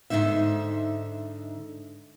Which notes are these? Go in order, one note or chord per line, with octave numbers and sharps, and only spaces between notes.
G#2 D3 D#3 D#4 E5